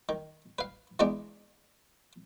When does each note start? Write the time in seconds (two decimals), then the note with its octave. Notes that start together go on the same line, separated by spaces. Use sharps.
0.09 D#3
0.59 B4 F5
0.99 E3 G#3 B3 D4 D#4